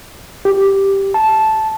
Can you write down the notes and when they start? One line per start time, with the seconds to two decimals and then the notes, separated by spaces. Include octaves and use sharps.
0.45 G4
1.14 A5